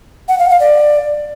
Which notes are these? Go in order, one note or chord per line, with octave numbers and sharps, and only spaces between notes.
F#5
F5
F5
D5